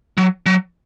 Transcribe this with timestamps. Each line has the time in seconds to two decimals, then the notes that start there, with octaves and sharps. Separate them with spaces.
0.18 F#3
0.46 F#3